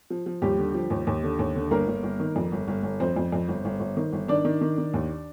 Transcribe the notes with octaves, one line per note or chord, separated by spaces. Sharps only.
F3
F3
D#2 G3 G4
D3
F3
D#2
D#2
D3
D#2
D3
G1 A#3 A#4
G1
G1
D#3
F2
G1
G1
G1
F2 C4 C5
F2
F2
G1
G1
G1
D#3
G1
D#3 D4 D5
D#3
D#3
D#3
D#2